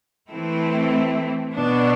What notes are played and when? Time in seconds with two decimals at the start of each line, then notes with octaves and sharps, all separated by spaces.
0.29 E3 A3 C4 E4
1.54 B2 B3 D4